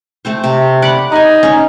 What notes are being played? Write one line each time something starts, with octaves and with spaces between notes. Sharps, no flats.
A3 C4 C5
C3
D5 F#5 B5
D#4 D#5 G#5
C#4